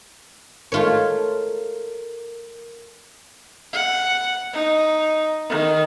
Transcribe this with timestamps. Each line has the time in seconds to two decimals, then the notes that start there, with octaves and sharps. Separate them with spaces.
0.72 A3 F4 A#4 C#5
3.73 F#5
4.53 D#4
5.49 D#3